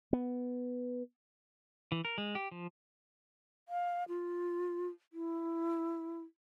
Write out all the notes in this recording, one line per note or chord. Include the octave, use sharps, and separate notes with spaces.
B3
E3
A#4
G#3
G4
F3
F5
F4
E4